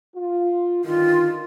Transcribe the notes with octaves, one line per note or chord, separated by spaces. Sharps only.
F4
G2 D3 D#3 F4